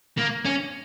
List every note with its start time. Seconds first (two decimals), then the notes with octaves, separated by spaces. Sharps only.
0.18 A#3
0.45 C#4